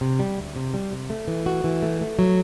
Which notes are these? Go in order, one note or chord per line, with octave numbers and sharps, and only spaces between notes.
C3
G3
D2
C3
G3
C3
A3
E3
F#4
E3
A3
A3
F#3